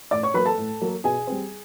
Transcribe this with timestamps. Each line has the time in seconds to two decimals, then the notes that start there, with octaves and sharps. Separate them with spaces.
0.11 A2 D5 D6
0.23 C#5 C#6
0.34 F#3 A#3 B4 B5
0.46 A4 A5
0.58 A2
0.82 F#3 A#3
1.04 B2 G#4 G#5
1.27 G3 C4